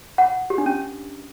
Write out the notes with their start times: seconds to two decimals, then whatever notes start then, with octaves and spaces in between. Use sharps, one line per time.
0.18 F#5
0.50 G4
0.58 D4
0.66 C#4